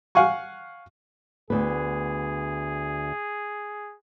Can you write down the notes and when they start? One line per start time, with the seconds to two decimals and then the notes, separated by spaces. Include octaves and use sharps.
0.15 F5 F#5 G#5 C#6
1.50 D2 B3 G#4